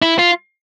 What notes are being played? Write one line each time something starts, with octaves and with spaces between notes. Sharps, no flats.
E4
F4